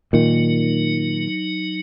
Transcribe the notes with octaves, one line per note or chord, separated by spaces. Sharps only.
A#2 D#3 F#3 D#4